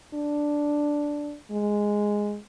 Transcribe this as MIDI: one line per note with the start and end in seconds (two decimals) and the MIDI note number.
0.14 1.35 62
1.51 2.38 56